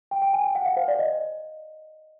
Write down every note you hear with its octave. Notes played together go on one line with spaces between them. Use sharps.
G5
G5
G#5
G5
F#5
F5
C5
D5
D#5